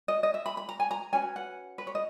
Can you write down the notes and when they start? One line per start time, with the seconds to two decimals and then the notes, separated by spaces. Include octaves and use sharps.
0.08 D#5
0.23 D#5
0.34 E5
0.46 B5
0.57 B5
0.69 A#5
0.80 G#5
0.91 A#5
1.13 C#4 F#4 B4 G#5
1.36 F#5
1.78 B4
1.87 C#5
1.95 D#5